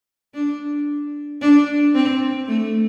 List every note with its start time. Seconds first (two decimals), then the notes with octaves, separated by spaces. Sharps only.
0.34 D4
1.42 D4
1.95 C4
2.48 A3